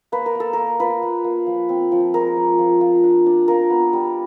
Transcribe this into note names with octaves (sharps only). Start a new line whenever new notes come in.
A#3 B4
A#4
A#3 A4
A#3 A#4
F4 B4
A#3
A#3
F3
C4
F3
G#3 A#4
F3
F3
F4
D4
D4
F4 A#4
B3
G3